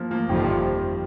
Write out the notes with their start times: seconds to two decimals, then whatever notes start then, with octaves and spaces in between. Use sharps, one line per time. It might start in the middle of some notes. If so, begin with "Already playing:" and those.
Already playing: F3 A#3
0.11 F3 A#3
0.29 G1 F2 C3 D#3 F3 G3